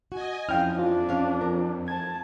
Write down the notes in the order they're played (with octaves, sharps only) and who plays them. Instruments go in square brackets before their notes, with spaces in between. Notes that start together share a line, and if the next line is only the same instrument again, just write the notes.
[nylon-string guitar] F#4 [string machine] D#5 G#5
[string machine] F2 [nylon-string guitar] C#4 E4 [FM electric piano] F5 G5 F6
[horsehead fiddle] D4 [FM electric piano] F4
[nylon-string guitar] C#4 F5
A#4
[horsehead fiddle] A5 [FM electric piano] G#6